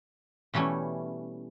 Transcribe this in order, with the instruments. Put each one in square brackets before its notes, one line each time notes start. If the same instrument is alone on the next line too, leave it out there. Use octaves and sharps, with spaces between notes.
[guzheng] B2 E3 G3 A3 C#4